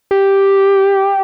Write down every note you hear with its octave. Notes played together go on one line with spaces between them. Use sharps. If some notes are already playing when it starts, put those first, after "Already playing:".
G4